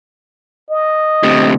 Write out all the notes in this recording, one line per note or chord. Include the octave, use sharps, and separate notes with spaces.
D#5
D2 C3